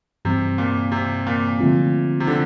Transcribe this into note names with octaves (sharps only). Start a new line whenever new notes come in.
G2 C3 E3 G3 C4
A#2
C3
A#2
D3 F3 A3 C4 F4
C3
D3